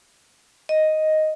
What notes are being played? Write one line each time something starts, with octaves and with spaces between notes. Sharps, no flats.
D#5